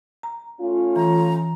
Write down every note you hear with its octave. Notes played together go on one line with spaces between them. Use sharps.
A#5
A3 C#4 F4
E3 A#5